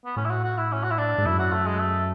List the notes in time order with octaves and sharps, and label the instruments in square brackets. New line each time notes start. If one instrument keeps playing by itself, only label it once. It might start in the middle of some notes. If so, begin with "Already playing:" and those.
[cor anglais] B3
[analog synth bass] A2 [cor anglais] C#4
[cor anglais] E4
F#4
F#4
E4
C#4
F#4
E4
D4
[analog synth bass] G#2
[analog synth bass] F#2 [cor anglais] E4
[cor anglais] F#4
A3
G#3
A3